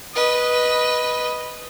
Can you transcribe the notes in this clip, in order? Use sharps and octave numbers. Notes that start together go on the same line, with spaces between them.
B4 D#5